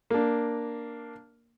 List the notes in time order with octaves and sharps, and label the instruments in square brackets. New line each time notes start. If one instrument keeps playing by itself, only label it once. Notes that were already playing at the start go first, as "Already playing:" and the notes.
[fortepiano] A#3 D4